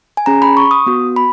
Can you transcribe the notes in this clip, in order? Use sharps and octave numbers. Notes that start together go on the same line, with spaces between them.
G#5
C#4 G#4 A#5
B5
C#6
D#6
B3 F#4
B5